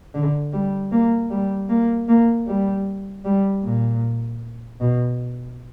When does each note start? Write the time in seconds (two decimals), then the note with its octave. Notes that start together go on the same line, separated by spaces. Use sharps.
0.14 D3
0.53 G3
0.92 A#3
1.31 G3
1.69 A#3
2.08 A#3
2.47 G3
3.25 G3
3.63 A#2
4.80 B2